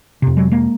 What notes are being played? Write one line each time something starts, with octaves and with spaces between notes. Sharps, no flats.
F2 C3
F#3 G#3
G#3 A#3